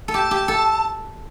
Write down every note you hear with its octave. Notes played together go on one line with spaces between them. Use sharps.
A4
G4 A5
G4
A4